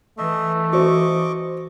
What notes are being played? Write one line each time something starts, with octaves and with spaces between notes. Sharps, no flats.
E3 A3 D#5 E5
F#4 C5 D#5 C#6 D6